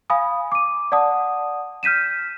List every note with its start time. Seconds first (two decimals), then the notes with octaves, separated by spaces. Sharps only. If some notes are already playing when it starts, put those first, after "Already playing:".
0.10 F5 G#5 B5 D#6
0.52 D6 D#7
0.92 D5 F#5 A5 D#6
1.83 F6 G6 B6 D#7 E7